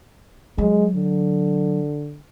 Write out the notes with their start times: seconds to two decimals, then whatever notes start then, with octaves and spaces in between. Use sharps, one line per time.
0.58 F#3 G#3
0.95 D3